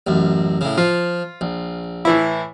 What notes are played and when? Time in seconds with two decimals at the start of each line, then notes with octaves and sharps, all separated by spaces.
0.07 A1 F#2
0.61 A2 C#3
0.78 F3 F4
1.41 A#1
2.05 A2 E3 E4